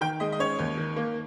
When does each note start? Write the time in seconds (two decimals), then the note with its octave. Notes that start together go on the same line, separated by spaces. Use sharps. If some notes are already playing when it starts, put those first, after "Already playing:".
0.01 D#3 G5
0.20 G#3 D#5
0.32 D#5
0.39 C#4 C#5
0.59 D#2
0.77 D#3
0.96 A#3